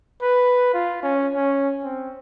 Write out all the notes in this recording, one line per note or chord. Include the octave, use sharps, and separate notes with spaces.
B4
F4
C#4
C#4
C4